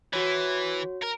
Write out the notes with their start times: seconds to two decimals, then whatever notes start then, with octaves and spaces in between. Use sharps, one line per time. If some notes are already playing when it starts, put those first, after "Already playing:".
0.13 E3 F#4 C#5
1.02 A#4